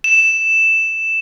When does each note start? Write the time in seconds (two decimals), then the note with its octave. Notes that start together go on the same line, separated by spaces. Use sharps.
0.04 E7